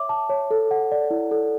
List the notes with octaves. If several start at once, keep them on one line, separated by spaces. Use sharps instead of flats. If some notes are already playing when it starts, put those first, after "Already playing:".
Already playing: C#5 E5 D6
A5
C#5
A4
F#5
D5
E4
A4